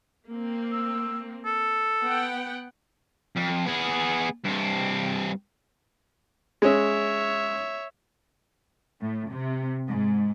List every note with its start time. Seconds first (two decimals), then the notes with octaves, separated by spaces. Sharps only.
0.28 A#3 C4
0.72 E6
1.45 A4
2.02 B3 F#5 G5
3.36 F2
3.66 B3 G#4
4.45 G2 C4
6.62 G#3 C#4 C#5 E5
9.00 A2
9.30 C3
9.89 G#2